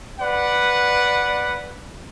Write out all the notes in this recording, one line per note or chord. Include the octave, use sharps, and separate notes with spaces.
B4 D5 F#5